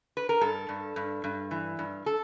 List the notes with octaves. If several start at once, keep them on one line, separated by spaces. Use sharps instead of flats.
B4
A#4
G2 A4
G2
G2
G2
E3
G2
A4